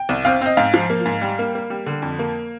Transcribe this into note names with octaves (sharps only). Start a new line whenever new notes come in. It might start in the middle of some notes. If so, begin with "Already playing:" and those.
Already playing: G5
C2
C4 F5
C4 D#5
G#2 F5
F3
A#3
G#2
G3
A#3
A#3
G3
D3
F2
A#3